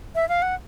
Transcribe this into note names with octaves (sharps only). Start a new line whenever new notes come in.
E5
F5
F#5